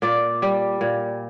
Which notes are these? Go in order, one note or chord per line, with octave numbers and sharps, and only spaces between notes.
A#2 D5
G3
A#2